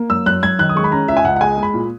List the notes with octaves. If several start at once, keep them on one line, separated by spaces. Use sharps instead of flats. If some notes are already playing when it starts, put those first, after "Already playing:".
Already playing: A#3
F#2 E6
F#2 F#6
F#2 G#6
D#3 F#6
D#6
G#3 C#6
B5
C#4 A#5
C#2 E5
G#5
C#2 F#5
F#5
G#3 G#5
G#3
B5
A#2